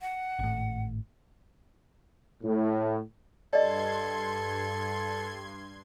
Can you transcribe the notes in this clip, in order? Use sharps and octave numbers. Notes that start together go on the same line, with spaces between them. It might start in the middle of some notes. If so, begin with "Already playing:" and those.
F#5
G#1 A2
A2
G2 A4 D5 D#5 C6 G#6